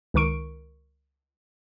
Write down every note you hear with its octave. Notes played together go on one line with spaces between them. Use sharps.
C#2 D#3 A#4 C#6 D7